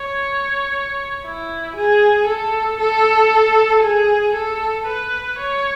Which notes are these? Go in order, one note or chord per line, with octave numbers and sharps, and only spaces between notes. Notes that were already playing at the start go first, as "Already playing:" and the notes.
Already playing: C#5
E4
G#4
A4
A4
G#4
A4
B4
C#5